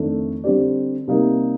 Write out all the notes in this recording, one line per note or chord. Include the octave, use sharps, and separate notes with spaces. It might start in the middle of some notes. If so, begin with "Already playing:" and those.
Already playing: F2 D#3 A3 D4 A4
D3 G3 C4 G4 D5
C3 G3 A#3 D#4 A#4